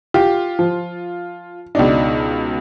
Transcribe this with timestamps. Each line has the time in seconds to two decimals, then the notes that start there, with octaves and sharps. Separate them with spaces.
0.14 F4 G4
0.59 F3
1.75 C#2 B2 D4 D#4